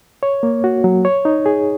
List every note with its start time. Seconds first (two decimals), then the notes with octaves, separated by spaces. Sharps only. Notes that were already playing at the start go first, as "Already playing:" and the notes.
0.23 C#5
0.43 A#3
0.64 F#4
0.84 F#3
1.05 C#5
1.25 D#4
1.46 G#4